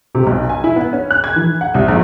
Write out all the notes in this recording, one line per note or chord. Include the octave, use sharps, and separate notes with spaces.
C3
B1
G#5
E4
B3
C#4
F#6
G#6
E3
F#5
C2
A#1